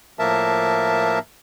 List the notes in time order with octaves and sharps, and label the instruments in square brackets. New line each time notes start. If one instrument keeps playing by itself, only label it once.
[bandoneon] A2 F3 A#3 A#4 E5 A5